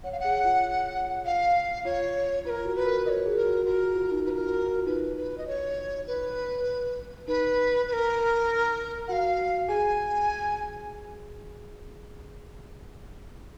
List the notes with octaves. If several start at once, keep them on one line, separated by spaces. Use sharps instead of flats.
C#5 F#5
F5
G#4 F#5
F4
F5
F4 C#5
F4 B4
A#4
F#4
B4
A#4
A#4 D#5
C#5
G#4
A#4
F#4
F#4 A#4
F4
D#4
F4 B4
A#4
F#4
F4
D#4 B4
B4
D#5
C#5
B4
D#4 B4
B4
A#4
F#4 F5 F#5
G#4 G#5